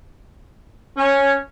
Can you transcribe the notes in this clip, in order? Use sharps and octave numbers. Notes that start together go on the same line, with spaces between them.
C#4